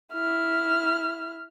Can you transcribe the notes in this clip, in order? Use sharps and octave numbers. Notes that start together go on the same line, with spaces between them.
E4 F6